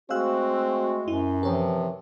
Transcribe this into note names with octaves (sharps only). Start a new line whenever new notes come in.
G#3 A3 C4 F#4 F5 E6 F#6
F#2 E4
C3 E3 F3 A#4 C#5